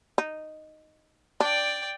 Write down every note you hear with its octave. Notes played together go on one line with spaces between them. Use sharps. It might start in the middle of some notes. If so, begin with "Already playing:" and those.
D#4
D4 D5 G5